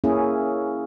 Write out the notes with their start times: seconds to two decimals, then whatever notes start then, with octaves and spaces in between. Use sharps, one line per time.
0.04 A#3 C#4 E4 G#4